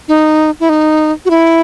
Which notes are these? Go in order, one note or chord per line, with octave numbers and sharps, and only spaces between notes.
D#4
E4
D#4
F#4
E4